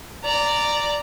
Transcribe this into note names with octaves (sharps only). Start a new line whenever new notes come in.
D5 A#5